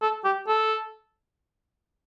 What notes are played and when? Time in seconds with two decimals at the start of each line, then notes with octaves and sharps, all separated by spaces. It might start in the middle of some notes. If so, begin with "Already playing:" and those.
0.02 A4
0.24 G4
0.48 A4